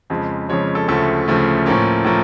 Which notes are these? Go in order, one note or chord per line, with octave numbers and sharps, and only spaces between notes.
F2 C#3 F3 G#3
F2 C#3 F3 G#3 C#5
A4
D2 C#3 F3 A3 A4
D2 C#3 F3 A3
A2 F3 A#3 C#4
A2 F3 A#3